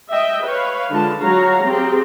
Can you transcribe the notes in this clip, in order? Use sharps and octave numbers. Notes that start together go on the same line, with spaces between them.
D#5 E5 G5
B4 C#5 F5
D3 G#3 F4 A5
F#3 F#4 C#5 F5 A#5
C4 G4 G#4